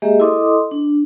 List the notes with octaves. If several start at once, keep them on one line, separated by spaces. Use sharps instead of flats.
G#3 A#3 G4 G#4 D#5 E5
E4 A4 D#5 C6 D6 D#6
D4